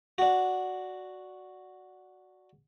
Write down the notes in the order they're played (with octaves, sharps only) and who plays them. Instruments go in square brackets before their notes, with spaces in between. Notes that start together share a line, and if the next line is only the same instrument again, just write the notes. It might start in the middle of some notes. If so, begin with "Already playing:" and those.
[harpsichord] D4 F#4